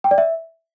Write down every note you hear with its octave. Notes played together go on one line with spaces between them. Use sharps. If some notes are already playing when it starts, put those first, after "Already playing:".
G5
D5
E5